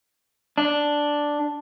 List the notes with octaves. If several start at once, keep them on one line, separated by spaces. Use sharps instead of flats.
D4